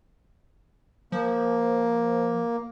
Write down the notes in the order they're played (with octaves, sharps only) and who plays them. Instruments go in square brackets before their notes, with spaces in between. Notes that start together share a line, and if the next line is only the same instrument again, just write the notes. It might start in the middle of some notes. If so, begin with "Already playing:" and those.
[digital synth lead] F3 [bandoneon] A#3